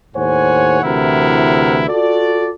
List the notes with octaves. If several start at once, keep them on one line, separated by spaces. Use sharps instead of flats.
D#2 A2 C5 C#5 F#5 G#5
D2 C3 E3 E4 A#4 F#5
F4 F#4 A4 D5